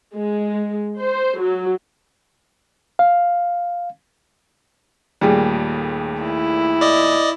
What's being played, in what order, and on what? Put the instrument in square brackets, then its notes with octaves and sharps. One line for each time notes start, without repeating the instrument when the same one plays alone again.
[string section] G#3
C5
F#3
[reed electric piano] F5
[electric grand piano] D#2 A#2 A3 [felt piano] G3 G#4
[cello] E4
[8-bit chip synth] D5 D#5